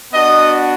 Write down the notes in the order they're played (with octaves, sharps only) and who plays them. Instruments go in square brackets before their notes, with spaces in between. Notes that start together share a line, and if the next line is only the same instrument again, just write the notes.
[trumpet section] B3 D4 F#4 D#5